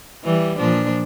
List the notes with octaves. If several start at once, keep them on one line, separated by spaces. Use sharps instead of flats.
E3 G3
A#2 F3 D4